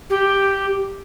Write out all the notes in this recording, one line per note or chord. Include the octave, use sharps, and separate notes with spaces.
G4